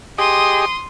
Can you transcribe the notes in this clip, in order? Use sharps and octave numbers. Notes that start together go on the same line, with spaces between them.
G4 G#4 D#5 C6 D#6